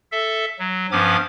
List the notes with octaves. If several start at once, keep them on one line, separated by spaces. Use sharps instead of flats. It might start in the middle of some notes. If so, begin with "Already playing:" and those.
A4 E5
F#3
G2 F3 B3 C#4 D6 G#6